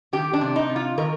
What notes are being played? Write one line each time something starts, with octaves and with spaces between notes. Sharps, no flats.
D#3 G4
D4
C3
D#4
C3
F4
D#3 A#4